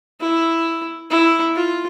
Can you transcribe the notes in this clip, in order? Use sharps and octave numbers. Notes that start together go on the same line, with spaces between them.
E4
E4
F4